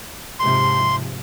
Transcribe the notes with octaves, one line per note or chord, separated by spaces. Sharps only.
G#2 C3 F3 C6